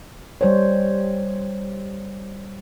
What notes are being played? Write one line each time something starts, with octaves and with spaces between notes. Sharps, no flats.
G3 C5 C#5